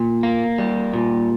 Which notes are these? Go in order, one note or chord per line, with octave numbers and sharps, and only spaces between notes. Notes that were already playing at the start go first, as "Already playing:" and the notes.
Already playing: A#2
A#3
G3
A#2